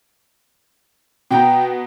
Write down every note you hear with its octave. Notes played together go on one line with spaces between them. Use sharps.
B2 B3 G5 A#5